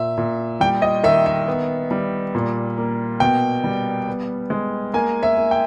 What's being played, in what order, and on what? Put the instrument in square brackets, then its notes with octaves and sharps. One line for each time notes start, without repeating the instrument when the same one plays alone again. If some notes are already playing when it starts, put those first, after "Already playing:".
Already playing: [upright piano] A#2 E5
A#2
G3 G5
D#5
D#3 E5
E5
B3
G3
A#2
A#3
B2 G5
G3
B3
G#3
A#3 G#5
E5
A#3
G5